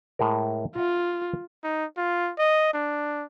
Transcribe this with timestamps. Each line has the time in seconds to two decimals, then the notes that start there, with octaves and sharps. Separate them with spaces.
0.19 A2 G#3 A#4
0.76 F4 E5 F#5 A#5
1.64 D#4
1.97 F4
2.39 D#5
2.73 D4